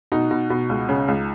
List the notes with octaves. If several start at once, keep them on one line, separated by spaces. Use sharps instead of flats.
B2 D#4
B2
B2
C#2
C#3
C#2